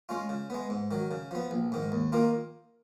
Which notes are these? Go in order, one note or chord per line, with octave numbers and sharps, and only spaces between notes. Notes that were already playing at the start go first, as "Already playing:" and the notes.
G#3 C#4 F4
C#3
G#3 B3
G#2
D#3 F#3
C#3
F3 B3
A#1
G#2 D#3
D#2
D#3 A#3 F4